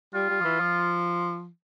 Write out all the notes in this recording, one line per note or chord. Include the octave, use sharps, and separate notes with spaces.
G3 F4
G3
F3
E3
F3